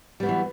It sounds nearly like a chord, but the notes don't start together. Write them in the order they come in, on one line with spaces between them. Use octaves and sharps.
G3 B3 F#3 E3